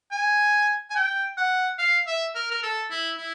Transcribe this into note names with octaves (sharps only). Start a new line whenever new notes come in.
G#5
G#5
G5
F#5
F5
E5
A#4
A#4
A4
E4
E4